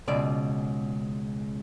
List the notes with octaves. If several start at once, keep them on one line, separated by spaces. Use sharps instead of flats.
C#2 B2 D5